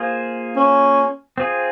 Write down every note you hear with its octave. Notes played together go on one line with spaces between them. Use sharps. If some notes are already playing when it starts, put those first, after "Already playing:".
Already playing: A#3 F4 G#4 C5
C#4
C4 F4 G#4